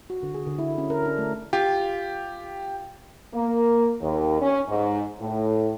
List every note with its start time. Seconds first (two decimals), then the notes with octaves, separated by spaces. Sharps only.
0.10 F#4
0.23 D3
0.34 G#4
0.46 D3
0.59 E4
0.78 C#4
0.90 A#4
1.05 D4
1.18 A3
1.53 F4 G4
3.34 A#3
4.01 D#2
4.39 C#4
4.68 G#2
5.20 A2